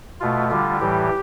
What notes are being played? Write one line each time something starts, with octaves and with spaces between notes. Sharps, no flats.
B2 A3 F4
D3 G3 F4
A2 E3 G3 G4